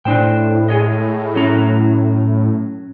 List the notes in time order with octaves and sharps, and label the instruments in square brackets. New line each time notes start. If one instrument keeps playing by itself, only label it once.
[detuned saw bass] A2 [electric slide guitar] D4 C5 G5
[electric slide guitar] G#4 C#5 D#5
F#3 C#4 A#5